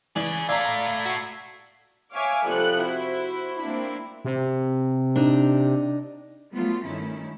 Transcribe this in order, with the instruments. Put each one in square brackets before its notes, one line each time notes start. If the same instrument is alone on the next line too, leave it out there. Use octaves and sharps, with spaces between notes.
[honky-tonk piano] E3 [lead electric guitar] C#4 G#4 [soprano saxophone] D5
[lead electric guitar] A2 A3 [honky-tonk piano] D5 A#5 [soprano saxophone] F5 [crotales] E6 G#6
[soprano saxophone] F#4 [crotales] B6 C7
[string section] C#5 E5 F5 G#5 C#6 D6
C3 F3 G3 A4 F#6 C#7
E4 F#4 C5
A#3 C4 D4 E4
[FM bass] C3
[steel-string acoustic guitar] D4 D#4
[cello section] F#3 G3 A3 B3 F4
G2 D#3 A3 C#4 E4